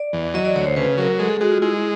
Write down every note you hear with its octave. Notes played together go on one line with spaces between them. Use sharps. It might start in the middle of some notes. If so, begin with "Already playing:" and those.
Already playing: D5
E2
F#3 D#5
D5
D2 C#5
C5
C#3 B4
F#3 A#4
G#3 A4
G#4
G#3 F#4
F4
G#3 E4